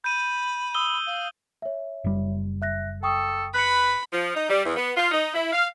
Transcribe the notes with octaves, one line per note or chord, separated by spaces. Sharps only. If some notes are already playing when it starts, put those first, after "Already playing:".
B5 G6 D#7
D#6 E6 G7
F5
C#5 E5
F#1 G3
E5 F#6 A#6
A4 G5 C#6 D#6
B4 B5 F#6 C#7
F3
D#4
G3
E2
B3
F4
D#4
E4
F5